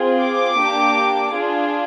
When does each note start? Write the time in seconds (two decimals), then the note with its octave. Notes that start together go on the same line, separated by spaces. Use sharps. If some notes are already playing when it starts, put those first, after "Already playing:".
Already playing: C4 F4 G#4
0.21 D6
0.58 A#3 D4 G4
1.33 D4 F4 G#4